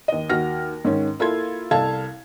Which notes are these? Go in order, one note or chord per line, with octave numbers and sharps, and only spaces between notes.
D#2 D#5
D#2 F#4 F6 A#6
G#2 D#3 C#4
A#3 E4 F4 A4 C6 G#6
C2 A4 F5 A5 G#6